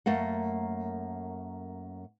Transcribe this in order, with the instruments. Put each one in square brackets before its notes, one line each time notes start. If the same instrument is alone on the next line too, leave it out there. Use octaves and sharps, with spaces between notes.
[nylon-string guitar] F#2 A3 A#3 F#5